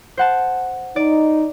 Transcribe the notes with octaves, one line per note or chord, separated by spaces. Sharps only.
C5 F#5 A5
D#4 D5